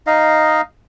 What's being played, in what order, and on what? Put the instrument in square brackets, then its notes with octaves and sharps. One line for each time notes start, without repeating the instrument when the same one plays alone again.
[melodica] D#4 D#5 F5